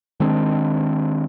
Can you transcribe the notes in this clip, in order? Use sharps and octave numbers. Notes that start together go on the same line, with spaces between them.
D#3 G#3 C4 D4